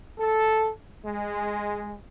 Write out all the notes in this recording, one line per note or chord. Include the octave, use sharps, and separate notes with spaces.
A4
G#3